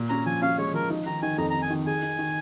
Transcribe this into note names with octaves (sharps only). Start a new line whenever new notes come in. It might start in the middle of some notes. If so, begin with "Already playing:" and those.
Already playing: A#2
C#4 A#5
F3 G#5
C#4 F5
G#3 C#5
F3 A#4
D#4
D#3 A#5
D#3 G#5
F2 A#5
D#3 A#5
G#5
D#3
G#4 G#5
D#3
D#3